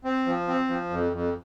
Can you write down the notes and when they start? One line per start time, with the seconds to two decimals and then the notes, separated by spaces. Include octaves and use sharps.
0.05 C4
0.26 F3
0.48 C4
0.69 F3
0.90 F2
1.12 F2